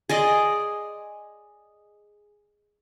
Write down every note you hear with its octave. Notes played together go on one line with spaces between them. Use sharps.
G#4 D5 D#5 C6